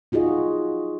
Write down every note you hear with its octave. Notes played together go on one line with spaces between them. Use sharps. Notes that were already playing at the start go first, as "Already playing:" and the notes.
D#4 F4 F#4 G#4 D#5